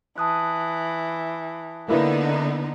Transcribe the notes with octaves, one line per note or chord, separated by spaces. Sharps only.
E3 A5 D#6 F#6
D3 A#3 B3 D#4 E4 B4